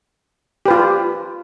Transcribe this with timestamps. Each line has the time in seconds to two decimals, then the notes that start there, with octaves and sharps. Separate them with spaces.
0.66 G4
0.68 B4
0.71 F4